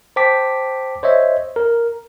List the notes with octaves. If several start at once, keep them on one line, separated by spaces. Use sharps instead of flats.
C5 G5 A5 D6 B6
C5 C#5 D#5 E5
A#4